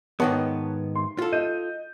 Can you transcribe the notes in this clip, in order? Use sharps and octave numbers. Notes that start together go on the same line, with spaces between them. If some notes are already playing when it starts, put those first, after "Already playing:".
G#2 D#3 B3 B4 C#5 A5
C6
F4 A4
D#5 G6 D#7